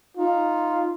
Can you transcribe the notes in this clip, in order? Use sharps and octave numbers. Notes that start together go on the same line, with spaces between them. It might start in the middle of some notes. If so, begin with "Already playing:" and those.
D#4 F4